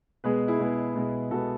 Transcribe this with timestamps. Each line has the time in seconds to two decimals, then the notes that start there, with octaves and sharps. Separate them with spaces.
0.24 B2 G#3 B3 G#4 B4
0.48 E4 G#4
0.60 B2 G#3 B3
0.95 B2 G#3 B3
1.31 B2 G#3 B3 F#4 A4